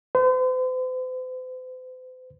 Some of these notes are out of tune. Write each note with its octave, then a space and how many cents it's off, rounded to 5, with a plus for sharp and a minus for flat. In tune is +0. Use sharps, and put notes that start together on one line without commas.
C5 -45